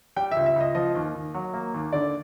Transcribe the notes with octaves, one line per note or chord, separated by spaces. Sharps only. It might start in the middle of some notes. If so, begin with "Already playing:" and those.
G3 G5
C#2 E5
E5
C#2 D#5
F3 D#5
D#2
D#2
F#3
A#3
D#2
D3 D5